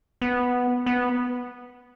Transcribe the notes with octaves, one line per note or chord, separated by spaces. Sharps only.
B3
B3